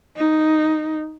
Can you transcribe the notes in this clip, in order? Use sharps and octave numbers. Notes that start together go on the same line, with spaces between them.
D#4